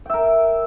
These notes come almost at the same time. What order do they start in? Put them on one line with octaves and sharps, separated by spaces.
G5 E5 A#4